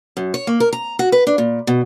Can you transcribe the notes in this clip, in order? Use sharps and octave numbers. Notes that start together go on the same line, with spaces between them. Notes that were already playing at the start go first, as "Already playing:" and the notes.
F#2
C#5
A#3
A#4
A#5
F#4
B4
D4
A#2
B2